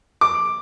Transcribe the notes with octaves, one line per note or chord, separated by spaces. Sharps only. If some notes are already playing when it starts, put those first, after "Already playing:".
D6